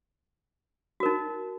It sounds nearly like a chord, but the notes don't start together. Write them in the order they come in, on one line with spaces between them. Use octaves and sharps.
F#4 A#4 D#4